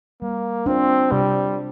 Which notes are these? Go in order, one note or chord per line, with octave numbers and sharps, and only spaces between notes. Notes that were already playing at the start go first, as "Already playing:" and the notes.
G3 A#3
C4 D4 F4 C5
C3 G3